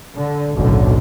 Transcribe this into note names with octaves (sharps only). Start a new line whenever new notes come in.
D3
F#1 B1 A2 D3